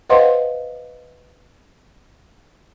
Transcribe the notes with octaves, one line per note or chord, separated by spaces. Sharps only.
B4 C5 D#5 F5 F#5 C6